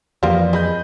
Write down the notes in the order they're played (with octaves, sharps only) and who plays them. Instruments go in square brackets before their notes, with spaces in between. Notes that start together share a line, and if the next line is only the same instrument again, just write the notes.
[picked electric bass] F2 E3 [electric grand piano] F3 [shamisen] G3 A#3 F4
[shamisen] G#3 [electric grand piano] D#5 B5 G6